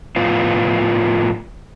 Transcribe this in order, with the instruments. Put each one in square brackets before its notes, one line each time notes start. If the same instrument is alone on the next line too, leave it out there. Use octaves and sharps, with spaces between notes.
[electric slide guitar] A2 F3 B3 F4